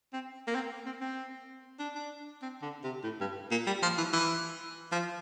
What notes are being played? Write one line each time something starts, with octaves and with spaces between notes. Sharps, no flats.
C4
A#3
C4
C4
C4
D4
D4
C4
D3
C3
A2
G2
A#2
G3
F3
E3
E3
F3